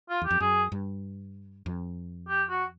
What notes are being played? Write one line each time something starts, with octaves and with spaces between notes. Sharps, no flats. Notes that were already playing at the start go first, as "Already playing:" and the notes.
F4
E2
G4
F2
F#2 G#4
G2
F2
G4
F#4